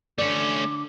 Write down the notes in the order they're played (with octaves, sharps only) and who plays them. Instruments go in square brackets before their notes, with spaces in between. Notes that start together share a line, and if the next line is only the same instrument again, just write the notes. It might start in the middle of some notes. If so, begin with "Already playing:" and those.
[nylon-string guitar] D3 D5 [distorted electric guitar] A3 C#4 [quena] D6